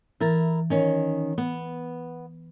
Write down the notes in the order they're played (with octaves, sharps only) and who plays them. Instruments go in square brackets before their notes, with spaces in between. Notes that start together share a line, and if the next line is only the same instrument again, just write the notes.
[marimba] E3 A6 [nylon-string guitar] E4 A#4
[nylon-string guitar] D#3 C#4
B3